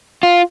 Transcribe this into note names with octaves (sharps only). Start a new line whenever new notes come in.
F4